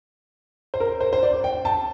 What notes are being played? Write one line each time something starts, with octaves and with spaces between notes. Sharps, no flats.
C5
A#4
C5
C5
D5
G5
A5